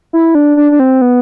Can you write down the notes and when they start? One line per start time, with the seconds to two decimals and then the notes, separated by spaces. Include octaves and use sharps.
0.13 E4
0.35 D4
0.57 D4
0.72 D4
0.79 C4
1.01 B3